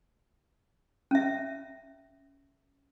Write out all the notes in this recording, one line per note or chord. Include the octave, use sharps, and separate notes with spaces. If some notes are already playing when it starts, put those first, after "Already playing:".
C#4 E5